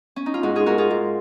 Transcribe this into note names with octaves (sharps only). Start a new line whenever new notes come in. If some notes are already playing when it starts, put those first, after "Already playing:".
C#4
D#4
F4
G#2 D#4 F#4
F4 G#4
G#2 F#4 A#4
F4 G#4
G#2